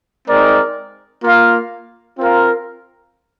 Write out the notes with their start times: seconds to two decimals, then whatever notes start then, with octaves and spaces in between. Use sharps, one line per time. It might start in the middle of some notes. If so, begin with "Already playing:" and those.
0.28 G#3 C4 D#4 A#4 D5
1.23 A#3 F4 A#4 F5
2.19 C4 F4 A#4 F5